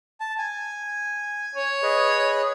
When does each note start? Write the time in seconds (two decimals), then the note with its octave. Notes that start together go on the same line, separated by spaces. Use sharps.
0.20 A5
0.38 G#5
1.55 C#5
1.83 G#4 B4 D#5